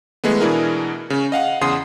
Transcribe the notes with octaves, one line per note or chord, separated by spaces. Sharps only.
E3 G#3 A3 B3
B2 E3 D4 E4 G#4 A#4
C#3 C#4
D#5 F5 F#5
E2 C#3 F#5 C6 D#6 C7